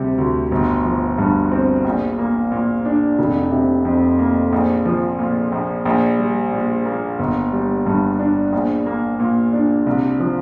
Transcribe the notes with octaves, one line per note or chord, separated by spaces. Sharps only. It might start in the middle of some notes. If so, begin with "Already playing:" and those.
Already playing: D2 C3 G3
D2
G1
F3
G2
C4
A#1
A#3
A#2
D4
F1
C3
F2
A#3
A#1
F3
A#2
A#1
A#1
G3
A#2
A#3
G1
G3
G2
D4
A#1
A#3
A#2
D4
C2
F3